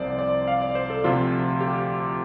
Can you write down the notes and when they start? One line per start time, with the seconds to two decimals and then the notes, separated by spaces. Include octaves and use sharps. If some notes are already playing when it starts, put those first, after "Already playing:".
Already playing: C2 C3 F3 C5 D5
0.19 D5
0.47 F5
0.62 D5
0.75 C5
0.90 A4
1.04 D2 C3 F3 F4
1.61 G4